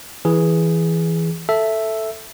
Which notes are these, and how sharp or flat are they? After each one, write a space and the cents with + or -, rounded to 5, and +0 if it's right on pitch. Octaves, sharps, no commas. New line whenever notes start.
E3 +0 G#4 +0
A4 +0 E5 +0